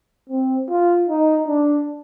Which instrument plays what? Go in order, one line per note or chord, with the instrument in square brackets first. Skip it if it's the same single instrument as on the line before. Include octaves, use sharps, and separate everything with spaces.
[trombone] C4
F4
D#4
D4